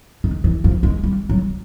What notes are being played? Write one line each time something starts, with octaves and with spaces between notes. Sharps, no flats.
D#3
E3
F3
G#3
G3
F#3